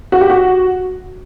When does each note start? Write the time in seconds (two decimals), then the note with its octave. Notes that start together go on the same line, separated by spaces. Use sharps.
0.12 F#4
0.21 G4
0.30 F#4